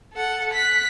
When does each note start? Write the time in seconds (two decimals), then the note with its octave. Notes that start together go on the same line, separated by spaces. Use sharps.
0.13 A4 F#5
0.54 F#6 B6